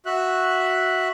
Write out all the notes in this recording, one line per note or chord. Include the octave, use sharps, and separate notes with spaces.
F#4 E5 F#6